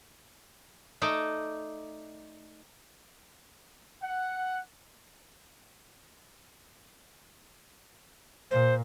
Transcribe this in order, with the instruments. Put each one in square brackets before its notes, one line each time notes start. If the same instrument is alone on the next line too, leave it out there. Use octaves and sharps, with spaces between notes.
[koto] A3 D#4 D5
[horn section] F#5
[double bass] A#2 [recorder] C5